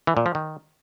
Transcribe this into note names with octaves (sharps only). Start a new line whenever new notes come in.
E3
A#2
F3
D#3